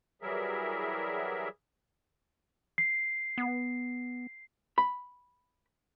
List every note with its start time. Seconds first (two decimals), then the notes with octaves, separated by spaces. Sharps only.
0.22 E3 F#3 G3 G#4 A#4 E5
2.78 C7
3.38 B3
4.78 B5